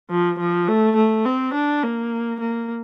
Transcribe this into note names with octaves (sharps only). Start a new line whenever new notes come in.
F3
F3
A3
A3
C4
D4
A#3
A#3